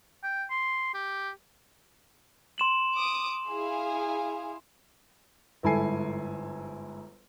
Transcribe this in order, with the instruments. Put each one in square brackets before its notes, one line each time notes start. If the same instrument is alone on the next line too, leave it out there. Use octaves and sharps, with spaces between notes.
[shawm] G5
C6
G4
[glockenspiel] C6 E7 F#7
[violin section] D6 D#6
E4 G#4 F5
[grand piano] G1 G#2 E4 A4 G#5 C7